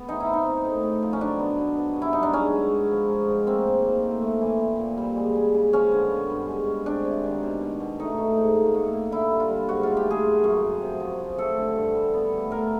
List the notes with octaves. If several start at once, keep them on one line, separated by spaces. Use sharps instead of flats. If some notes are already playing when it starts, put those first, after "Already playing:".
Already playing: B3
E3 D#4
E4
C4
D#4
C4
A2
A2
F3
C#4
F#3 D4
B3
B2
B3
G2
E4
F#3 D#4
D4
G#3 C#4
G#3
G#3
F3
G#3
F3
A#3 C4
G#2
A#3
A2
A3
E3
A#2
A#2
G3
G#3
C#3
C#3
F3 C#4
D3
B3
G2
G#3
G#3
C4 D4
C3
D#3
B2
B2
B2
A3 D#4
A3
G#2
A#3
A2
A#3
D3 E4
G3
F4
G3
G#2 F#4
A3 F4
G4
A3 G#4
F#2
F#2
F#2
C3
F3
F3
A3 A4
D3
G2
G3
B3
A2
A2 A#4